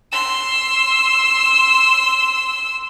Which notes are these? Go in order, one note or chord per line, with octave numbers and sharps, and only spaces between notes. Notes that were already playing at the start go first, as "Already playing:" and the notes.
C6 E6